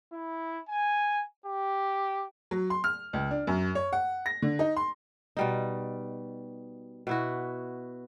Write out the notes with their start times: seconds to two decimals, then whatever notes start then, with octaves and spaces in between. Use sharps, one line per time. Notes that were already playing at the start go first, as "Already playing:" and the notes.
0.12 E4
0.69 G#5
1.46 G4
2.51 F#3
2.70 C6
2.84 F6
3.13 C#2
3.31 D4
3.47 F#2
3.75 C#5
3.93 F#5
4.26 A#6
4.42 D3
4.59 D#4
4.76 C6
5.37 B2 G3 D#4
7.07 B2 E4 F#4